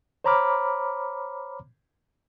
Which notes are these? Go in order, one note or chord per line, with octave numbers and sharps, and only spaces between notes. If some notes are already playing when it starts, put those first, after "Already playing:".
C5 C#5 A#5 B5 D6 F6